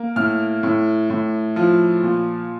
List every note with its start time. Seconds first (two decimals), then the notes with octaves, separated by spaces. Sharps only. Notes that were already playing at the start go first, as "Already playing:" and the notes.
Already playing: A#3
0.16 A2 F6
0.63 A2
1.10 A2
1.56 F3
2.03 A#2